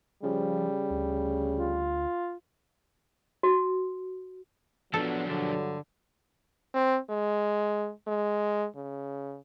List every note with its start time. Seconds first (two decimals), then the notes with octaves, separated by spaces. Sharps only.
0.23 C#3 F3 G3
0.90 D2
1.56 F4
3.43 F#4
4.94 F3 F#3 B3 D4 A4
5.28 G2 D3 F#3
6.74 C4
7.10 G#3
8.07 G#3
8.76 C#3